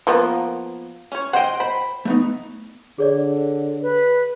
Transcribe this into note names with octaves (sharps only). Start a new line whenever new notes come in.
F3 A#3 B3
C#4 C#5
C5 D#5 F#5 G5
C5 B5
A3 B3 D#4
D3 G#4 C#5 D5
B4